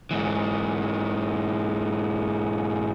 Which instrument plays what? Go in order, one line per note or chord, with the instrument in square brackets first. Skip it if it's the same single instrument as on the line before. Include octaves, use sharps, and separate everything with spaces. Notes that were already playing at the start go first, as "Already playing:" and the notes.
[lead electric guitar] G#2 E3